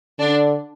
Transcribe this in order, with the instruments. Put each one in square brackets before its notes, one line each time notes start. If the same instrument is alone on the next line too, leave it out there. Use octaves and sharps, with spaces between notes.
[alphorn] D3 [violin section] D4